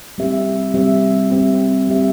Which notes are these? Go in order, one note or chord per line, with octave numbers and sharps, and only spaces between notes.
G3 C4 G4 E5
G3 C4 G4 E5
G3 C4 G4 E5
G3 C4 G4 E5